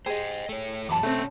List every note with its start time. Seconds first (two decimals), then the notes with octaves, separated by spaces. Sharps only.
0.06 G4 G#4 C5 D#5 C6
0.49 A3 C#5
0.89 F#2 E3 F#3 A5 B5 D6
1.03 B2 A3 C4 C#4 G5